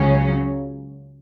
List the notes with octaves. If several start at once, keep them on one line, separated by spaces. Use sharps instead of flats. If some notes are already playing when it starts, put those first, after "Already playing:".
Already playing: C#2 C#3 F#3 C#4